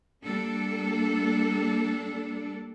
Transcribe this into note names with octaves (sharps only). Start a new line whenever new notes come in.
G3 A#3 D4 A4